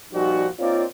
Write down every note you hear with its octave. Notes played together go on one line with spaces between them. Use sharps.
A#2 F3 G3 D#4 F#4
A#3 C4 D#4 F4 C#5 D5